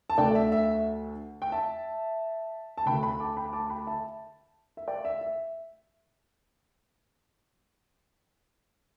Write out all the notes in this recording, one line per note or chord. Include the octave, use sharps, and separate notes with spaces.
A5
D2 D3 A3 D5 G5
E5
E5
G5
E5 A5
A5
D2 D3 A3 G5 B5
G5 B5
A5 D6
G5 B5
A5 D6
G5 B5
E5 A5
E5
D5 G5
E5
E5